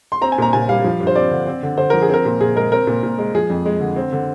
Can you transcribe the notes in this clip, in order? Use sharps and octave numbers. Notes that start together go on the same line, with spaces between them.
C6
C4 A#5
G#5
A#2 A#5
A#2 G#5
G3 F5
F3
G2
C5
C4 D5
D3
C4
D3
D3 C5
F3 A#4
G#4
C4 A#4
A#2
A#2 G#4
G#3 A#4
C4 A#4
A#2
A#2
G#3
F3 G#4
F2
G#3
D3
C4
D3